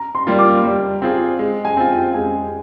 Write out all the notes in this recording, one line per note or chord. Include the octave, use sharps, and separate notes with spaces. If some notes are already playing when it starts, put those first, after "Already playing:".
Already playing: A#5
C6
G3 A#3 F4
D6
G3
C4 F4 G#4
G#3
G#5
C4 F4
G5
G#3 G#5